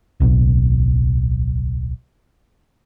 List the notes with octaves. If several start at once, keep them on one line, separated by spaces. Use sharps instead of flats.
D1 B1